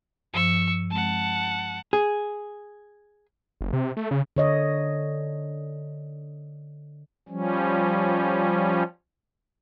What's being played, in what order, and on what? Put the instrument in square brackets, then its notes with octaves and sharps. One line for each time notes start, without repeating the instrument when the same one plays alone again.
[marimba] G2 F3 C5 [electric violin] C#6 E6
[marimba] G#3 C4 [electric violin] F#5 A5
[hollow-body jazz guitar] G#4
[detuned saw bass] F#1
C3
A3
C#3
[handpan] D3 C#5 D#5
[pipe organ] F3 G3 C#4